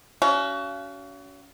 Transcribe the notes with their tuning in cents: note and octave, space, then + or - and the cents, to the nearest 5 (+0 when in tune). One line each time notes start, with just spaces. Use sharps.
C#4 +35 F#4 +30 F5 -30